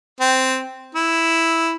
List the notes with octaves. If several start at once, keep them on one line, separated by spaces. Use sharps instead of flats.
C4
E4